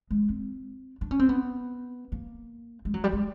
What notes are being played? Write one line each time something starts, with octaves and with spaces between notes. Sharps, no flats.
G#3
C4
D4
C#4
C4
B3
A#3
G#3
F#3
G3
G#3